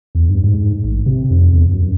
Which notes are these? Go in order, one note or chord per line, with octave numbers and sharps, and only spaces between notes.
E2
G2
G#2
A1
C3
F2
E2
F#2